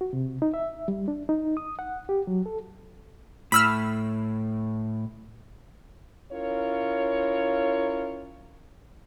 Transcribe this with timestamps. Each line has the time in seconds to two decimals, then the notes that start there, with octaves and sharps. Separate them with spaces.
0.01 F#4
0.13 C3
0.42 D#4
0.54 E5
0.88 G3
1.08 D4
1.29 D#4
1.57 D#6
1.79 F#5
2.09 G4
2.27 F#3
2.46 A4
3.52 A2 B5 E6 F6
6.33 C#4 E4 F4 A#4 C#5